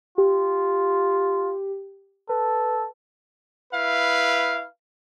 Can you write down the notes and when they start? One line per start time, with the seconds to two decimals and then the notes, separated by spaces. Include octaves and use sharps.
0.18 F4 G4
2.29 A4 B4
3.73 E4 B4 F5